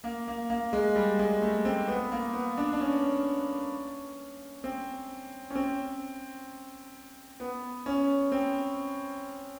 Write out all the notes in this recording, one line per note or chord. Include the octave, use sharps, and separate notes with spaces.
A#3
A#3
A#3
G#3
G3
G#3
A3
C4
B3
A#3
B3
D4
D4
C#4
C4
C#4
C4
B3
C#4
C4